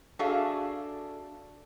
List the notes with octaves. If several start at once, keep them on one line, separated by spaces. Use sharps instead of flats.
D4 F#4 G#4 A4 E5 F5